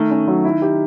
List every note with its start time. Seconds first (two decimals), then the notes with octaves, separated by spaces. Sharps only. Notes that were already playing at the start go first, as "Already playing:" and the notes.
Already playing: D#3 A3
0.11 C#4
0.27 F#3
0.44 E4
0.62 G4